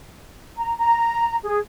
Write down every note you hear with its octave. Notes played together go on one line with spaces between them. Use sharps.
A#5
A#5
G#4